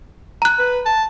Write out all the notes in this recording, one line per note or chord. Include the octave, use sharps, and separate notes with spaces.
A#5 F#6
B4
A5